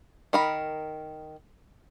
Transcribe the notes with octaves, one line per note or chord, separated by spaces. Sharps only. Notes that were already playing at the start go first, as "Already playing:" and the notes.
D#3 A#4 B5